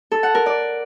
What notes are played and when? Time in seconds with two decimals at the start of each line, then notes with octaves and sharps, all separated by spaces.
0.12 A4
0.23 F#5
0.35 A#4
0.46 D5